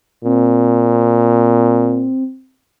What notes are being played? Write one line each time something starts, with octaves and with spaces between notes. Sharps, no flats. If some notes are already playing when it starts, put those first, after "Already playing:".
A#2 C4